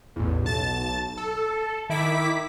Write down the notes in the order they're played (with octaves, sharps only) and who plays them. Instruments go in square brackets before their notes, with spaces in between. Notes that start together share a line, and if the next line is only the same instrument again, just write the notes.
[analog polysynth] A1 E2
B1 A5 A6
A4
D#3 E4 D6 B6